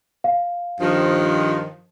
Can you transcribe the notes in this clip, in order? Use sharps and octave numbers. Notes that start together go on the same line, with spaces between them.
F5
G2 D#3 F3